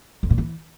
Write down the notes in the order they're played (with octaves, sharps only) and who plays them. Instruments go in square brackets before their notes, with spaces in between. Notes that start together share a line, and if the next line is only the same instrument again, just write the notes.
[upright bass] F2
A#2
E3